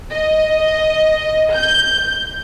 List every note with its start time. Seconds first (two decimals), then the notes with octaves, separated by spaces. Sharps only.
0.12 D#5
1.54 G6